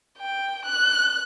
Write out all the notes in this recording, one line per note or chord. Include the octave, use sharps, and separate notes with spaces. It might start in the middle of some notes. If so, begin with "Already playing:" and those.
G5
F#6